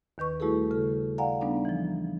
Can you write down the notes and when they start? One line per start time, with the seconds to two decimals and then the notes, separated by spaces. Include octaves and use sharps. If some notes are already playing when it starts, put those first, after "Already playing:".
0.18 D#2 D#3 B4 C#6
0.40 G3 A3 E4 F#4 G#4 A4
0.71 C#3 A4
1.18 D5 F5 F#5 G#5 A#5
1.41 G3 B3 D4 D#4
1.65 E3 F3